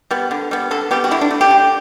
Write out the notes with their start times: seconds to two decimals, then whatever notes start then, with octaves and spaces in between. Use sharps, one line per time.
0.11 G3 B3
0.31 D3
0.51 G3 B3
0.71 D3 A4
0.91 G3 B3 G4
1.04 F#4
1.11 D3 E4
1.21 D4
1.31 A3
1.41 G4
1.51 D3